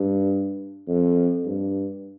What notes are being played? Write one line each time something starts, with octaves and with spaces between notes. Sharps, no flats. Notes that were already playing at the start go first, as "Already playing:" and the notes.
Already playing: G2
F2
G2